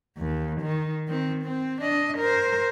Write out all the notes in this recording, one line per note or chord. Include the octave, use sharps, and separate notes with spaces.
D#2
D#3
D#3 C4
C4
D4 D#5
A#4 C5